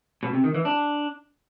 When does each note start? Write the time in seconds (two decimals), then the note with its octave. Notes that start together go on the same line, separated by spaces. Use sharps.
0.23 B2
0.33 C3
0.44 D#3
0.54 E3
0.65 D4